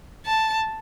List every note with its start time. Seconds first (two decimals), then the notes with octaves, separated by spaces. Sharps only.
0.26 A5